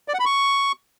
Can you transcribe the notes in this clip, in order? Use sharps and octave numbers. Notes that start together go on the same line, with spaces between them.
D5
F#5
B5
C#6